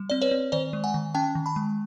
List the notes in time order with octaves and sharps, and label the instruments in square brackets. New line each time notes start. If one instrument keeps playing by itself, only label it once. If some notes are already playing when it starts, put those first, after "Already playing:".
Already playing: [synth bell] G3
C4 D5
B4 C#5
C4
D#3 C5 D5
G#3
F#5 G#5
D#3
C#4 G5 A5
D#3
A5 B5
G#3